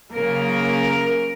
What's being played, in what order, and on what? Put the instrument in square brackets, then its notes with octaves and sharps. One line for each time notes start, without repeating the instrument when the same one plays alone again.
[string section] C#3 F#3 A#3 A#4